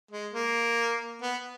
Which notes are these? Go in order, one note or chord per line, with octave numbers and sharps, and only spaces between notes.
G#3
A#3
B3